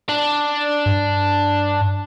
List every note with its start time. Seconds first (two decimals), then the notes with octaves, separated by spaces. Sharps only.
0.09 D4
0.86 G2